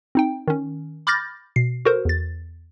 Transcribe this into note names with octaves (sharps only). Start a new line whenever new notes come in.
C4 D#4 G5
D#3 C#4
B5 D6 F6 G6 A6 A#6
B2 C7
F#4 A4 A#4 C5
E2 A6